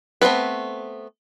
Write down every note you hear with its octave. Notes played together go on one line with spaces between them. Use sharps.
A3 B3 C4 A4 B4